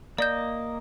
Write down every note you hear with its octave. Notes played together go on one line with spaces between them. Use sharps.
A#3 D5 D#5 G6